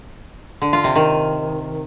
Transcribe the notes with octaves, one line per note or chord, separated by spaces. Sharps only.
D3
F4
C3
D#3